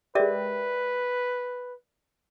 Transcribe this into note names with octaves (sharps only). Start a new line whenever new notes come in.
G#3 G4 A#4 B4 D5 E5